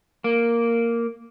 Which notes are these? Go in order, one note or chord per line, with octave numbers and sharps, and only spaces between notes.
A#3